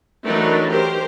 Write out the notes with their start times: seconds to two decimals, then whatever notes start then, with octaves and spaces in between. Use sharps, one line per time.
0.24 E3 F#3 A3 D4 D#4 A#4
0.69 G4 A#4 C5